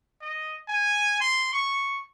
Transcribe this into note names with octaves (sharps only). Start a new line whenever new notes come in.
D#5
G#5
C6
C#6